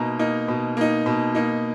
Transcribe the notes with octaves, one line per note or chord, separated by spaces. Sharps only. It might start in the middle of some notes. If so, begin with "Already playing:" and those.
Already playing: B2 A#3 D#4 A#5
A#3 D#4
B2
A#3 D#4
B2
A#3 D#4